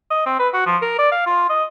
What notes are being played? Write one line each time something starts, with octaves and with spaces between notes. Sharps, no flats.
D#5
C4
B4
F#4
F3
A#4
D5
F5
F4
D#5